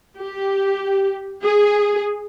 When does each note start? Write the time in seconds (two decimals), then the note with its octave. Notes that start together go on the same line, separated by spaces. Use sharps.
0.18 G4
1.43 G#4